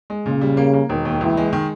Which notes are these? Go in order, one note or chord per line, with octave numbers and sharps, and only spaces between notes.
G#3
A#2 C#3
G3
A#3
A#3
E1 D#3
D#2
C#2 E3
G#3
D#3